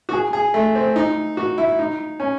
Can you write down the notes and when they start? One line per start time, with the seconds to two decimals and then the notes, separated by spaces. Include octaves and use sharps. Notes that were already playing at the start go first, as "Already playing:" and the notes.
0.09 F#4
0.13 G#4
0.33 G#4
0.54 A3
0.75 C4
0.96 D#4
1.37 F#4
1.58 E4
1.79 D#4
2.20 C#4